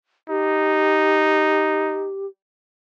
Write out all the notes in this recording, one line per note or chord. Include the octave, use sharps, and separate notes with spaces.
D#4 G4